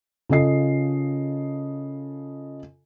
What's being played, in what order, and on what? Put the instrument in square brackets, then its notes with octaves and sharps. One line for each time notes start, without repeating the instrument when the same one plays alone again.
[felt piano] C#3 F4 A4 D#5 C7